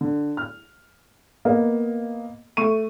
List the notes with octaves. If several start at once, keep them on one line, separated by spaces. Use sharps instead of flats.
D3
F6
A#3 B3 D#5
A3 C#6 D#7